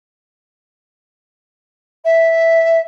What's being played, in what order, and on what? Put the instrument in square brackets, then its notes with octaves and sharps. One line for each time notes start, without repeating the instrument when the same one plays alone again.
[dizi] E5